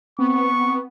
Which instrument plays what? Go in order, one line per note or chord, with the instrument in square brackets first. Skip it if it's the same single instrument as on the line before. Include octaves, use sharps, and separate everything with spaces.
[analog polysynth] B3 [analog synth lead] C4 [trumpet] C#6